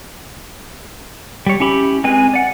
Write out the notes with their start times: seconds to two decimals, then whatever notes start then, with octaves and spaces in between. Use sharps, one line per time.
1.46 G3 C#5
1.60 C#4 E4 G4 B5
2.04 G#3 C4 B4 G#5
2.34 D5 F#5